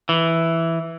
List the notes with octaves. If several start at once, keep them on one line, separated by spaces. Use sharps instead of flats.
E3